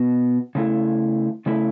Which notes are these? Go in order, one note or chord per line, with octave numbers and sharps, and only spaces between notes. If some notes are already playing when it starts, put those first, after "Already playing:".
Already playing: B2 B3 F#4
C#3 A3 E4
C#3 A3 E4